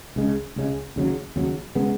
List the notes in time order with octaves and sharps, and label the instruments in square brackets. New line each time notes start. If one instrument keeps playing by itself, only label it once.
[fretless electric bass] C#2 C#3 G#3
C#2 C#3 G#3
D#2 C#3 F#3
D#2 C#3 F#3
C#3 G#3 B3